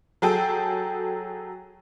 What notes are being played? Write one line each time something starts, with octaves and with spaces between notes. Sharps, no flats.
F#3 G#4 A4 G5